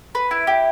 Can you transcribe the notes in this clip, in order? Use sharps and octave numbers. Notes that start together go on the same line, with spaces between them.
B4
E4
G4